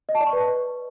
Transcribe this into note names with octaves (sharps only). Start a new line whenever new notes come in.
D#5
A5
D5
C#6
B4